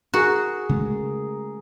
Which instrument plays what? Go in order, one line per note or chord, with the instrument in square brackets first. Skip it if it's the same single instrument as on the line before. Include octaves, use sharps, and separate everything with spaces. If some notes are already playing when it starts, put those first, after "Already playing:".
[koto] F#4 [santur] G#4 A#4
[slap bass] C#3 G#3 A3